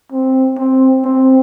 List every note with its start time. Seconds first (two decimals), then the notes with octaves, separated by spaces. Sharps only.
0.12 C4
0.58 C4
1.05 C4